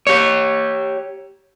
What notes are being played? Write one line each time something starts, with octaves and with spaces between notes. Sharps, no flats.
G4 C#5